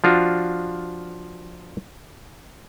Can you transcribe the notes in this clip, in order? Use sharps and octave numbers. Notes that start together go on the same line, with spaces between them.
F3 D4 F4 F#4